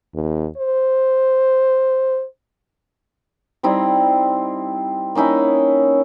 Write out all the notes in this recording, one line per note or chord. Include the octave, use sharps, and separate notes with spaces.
D#2
C5
G3 C4 D#4 E4
A#3 C#4 D#4 E4